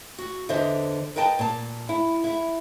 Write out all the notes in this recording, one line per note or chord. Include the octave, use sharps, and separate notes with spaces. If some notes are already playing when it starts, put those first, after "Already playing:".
F#4
E2 D3 C5 D#5 E5
A#4 B4 D#5 G5 A5
A#2 A5
E4
E4 E5